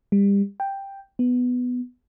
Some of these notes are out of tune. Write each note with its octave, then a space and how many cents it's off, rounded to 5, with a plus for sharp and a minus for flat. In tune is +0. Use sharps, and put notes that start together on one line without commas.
G3 +30
G5 +5
B3 +5